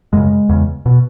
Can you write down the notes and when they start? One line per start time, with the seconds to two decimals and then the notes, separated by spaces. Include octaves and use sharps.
0.13 F#2 C#3 G#3
0.49 E2 C#3
0.86 B2